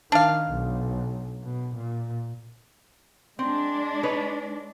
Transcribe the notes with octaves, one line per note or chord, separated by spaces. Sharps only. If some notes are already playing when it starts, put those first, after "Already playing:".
D#3 D4 F5
B1
B2
A#2
G#3 C4 D4
D#4 B4 C#5